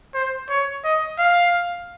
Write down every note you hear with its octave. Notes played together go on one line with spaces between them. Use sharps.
C5
C#5
D#5
F5